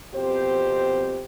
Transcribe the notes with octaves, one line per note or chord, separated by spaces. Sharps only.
F2 B2 C4 G4 C5